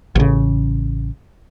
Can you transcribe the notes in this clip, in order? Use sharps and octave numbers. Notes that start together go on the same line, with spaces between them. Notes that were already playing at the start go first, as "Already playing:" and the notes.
A1 C#3